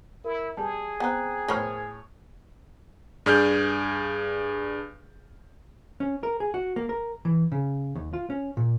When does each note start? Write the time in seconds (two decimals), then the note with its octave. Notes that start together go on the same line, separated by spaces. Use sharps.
0.25 E4 A#4
0.57 G3 G#4 A5
1.00 B3 C4 G5 A#5 F#6
1.48 A2 A#4 C5 C#5 B5 F6
3.26 G2 G#4 D5 F6 G6
6.00 C#4
6.23 A#4
6.40 G#4
6.54 F#4
6.76 A#3
6.89 A#4
7.25 E3
7.52 C#3
7.95 D#2
8.13 F4
8.30 C#4
8.57 A#2